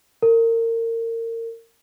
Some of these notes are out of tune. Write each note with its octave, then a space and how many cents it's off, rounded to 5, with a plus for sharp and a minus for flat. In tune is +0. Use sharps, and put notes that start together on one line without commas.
A#4 -30